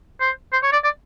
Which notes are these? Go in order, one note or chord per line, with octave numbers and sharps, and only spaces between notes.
C5
C5
C#5
D5
D5